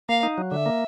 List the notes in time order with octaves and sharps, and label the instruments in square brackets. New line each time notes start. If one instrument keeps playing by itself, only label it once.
[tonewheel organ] A#3 [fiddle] F5
[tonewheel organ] D#4
F#3
[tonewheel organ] D3 [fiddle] E5
[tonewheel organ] A#3